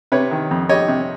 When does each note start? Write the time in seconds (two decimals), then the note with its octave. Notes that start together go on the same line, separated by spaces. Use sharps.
0.12 C3 B4 C#5
0.31 D#3
0.51 F2
0.69 G3 C#5 D#5
0.88 C3